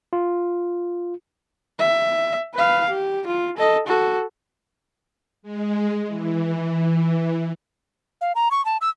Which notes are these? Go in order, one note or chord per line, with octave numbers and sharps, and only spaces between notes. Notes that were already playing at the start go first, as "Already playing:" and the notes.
F4
E5
B4 F5
G4
F4
A4 D#5
F#4 A4
G#3
E3
F5
A#5
C#6
A5
E6